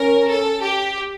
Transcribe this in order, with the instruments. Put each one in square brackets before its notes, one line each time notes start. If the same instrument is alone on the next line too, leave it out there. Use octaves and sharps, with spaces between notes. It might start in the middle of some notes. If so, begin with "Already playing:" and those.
Already playing: [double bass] C#4 [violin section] A#4
[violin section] A4
G4